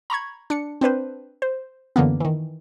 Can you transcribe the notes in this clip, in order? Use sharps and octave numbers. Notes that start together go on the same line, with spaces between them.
A#5 B5 C#6 G#6
D4 C#7
C4 D4 B4 C5
C5
F#2 D3 E3 A#3 B3
D#3 E3